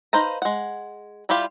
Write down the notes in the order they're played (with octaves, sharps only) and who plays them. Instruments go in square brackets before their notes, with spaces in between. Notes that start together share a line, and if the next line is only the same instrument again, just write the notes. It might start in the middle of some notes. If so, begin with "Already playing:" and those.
[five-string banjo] D#4 B4 C5 F5 A#5
G#3 F#5
G3 E4 F4 G4 F5